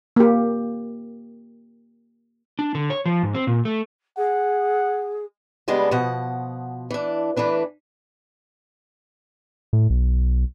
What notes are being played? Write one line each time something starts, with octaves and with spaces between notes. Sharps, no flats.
A#3 G4
D4
D3
C#5
F3
G#2
C4
A#2
A3
G#4 F#5
C#3 G3 G#3 B3 D4
B2 F3 F#5
E3 D4
E3 A3 D4 B4
A2
B1